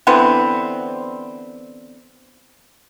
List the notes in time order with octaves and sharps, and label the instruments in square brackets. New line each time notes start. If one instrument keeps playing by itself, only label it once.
[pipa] D3 E3 B3 C4